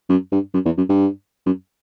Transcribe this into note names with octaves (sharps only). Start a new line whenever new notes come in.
F#2
G2
F#2
E2
F#2
G2
F#2